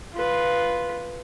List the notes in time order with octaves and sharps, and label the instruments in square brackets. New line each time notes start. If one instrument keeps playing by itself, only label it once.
[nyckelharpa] F4 B4